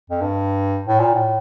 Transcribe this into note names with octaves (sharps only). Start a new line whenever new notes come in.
F2
G2
A2
A#2
A2